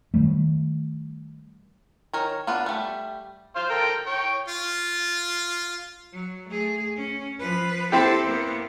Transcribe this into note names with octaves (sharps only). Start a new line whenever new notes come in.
D#3 F3 G3 A3
D#3 A#4 C#5
B3 D4 F4
G3 A3
C5 F5
A4 A#4 G5
C#5 G5
F4
F#3
A3 G#4
C#4
F3 B4
C4 E4 G4 A4 C5
A#3 B3